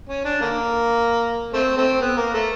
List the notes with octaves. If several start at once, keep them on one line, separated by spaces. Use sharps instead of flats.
C#4
D4
D3 A#3
A3 C4
A3 C4
B3
A#3
A3